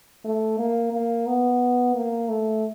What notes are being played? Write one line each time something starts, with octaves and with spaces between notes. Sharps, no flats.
A3
A#3
A#3
B3
A#3
A3